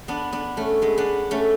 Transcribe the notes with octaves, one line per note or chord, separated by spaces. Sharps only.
B3 D4
B3 D4
A3 C#4
G#3 B3
B3 D4
A3 C#4